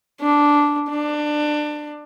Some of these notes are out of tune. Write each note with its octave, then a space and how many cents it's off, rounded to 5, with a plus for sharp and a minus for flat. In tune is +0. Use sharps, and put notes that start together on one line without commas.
D4 -5
D4 +20